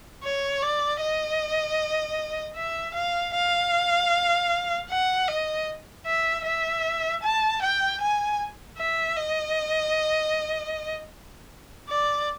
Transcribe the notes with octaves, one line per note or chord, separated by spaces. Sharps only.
C#5
D5
D#5
E5
F5
F5
F#5
D#5
E5
E5
A5
G5
G#5
E5
D#5
D5